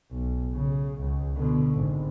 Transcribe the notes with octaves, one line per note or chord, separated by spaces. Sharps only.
B1
C#3
C#2
B2 D3
G#1